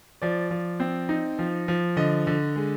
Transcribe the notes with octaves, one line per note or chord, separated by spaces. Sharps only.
F3 D5
F3
C4
D#4
F3
F3
D3 D#5
D3
G#3